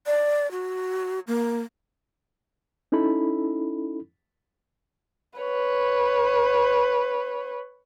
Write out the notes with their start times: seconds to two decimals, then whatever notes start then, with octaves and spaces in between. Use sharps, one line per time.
0.06 D5
0.51 F#4
1.27 A#3
2.92 C#4 D#4 E4 A4 B5
5.39 B4 C#5